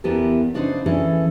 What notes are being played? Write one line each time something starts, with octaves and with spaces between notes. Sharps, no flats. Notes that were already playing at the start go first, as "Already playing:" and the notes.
E2 E3 B3 G4 A4 A#4
C#3 D4 D#4 F#4 B4 C5
E3 C#4 D4 G#4 A4